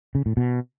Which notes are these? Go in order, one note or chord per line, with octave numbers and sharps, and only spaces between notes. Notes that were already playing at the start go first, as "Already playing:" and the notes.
C#3
A2
B2